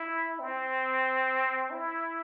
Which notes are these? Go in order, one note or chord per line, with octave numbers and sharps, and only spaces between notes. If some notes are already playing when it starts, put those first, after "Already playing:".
Already playing: E4
C4
E4